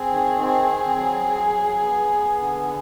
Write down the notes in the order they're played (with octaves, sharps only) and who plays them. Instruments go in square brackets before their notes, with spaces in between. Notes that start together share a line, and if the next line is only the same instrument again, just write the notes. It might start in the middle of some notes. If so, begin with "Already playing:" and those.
Already playing: [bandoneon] C4 [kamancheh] G#4
[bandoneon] D#3
C4
C4
F#3
F#3
F#3
B3
B3
D3